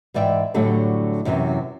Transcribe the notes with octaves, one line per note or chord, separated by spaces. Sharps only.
G#2 E3 D5 E5 G5
A2 D3 F#3 G3 A3 D4
F#2 C3 E3 F#3 B3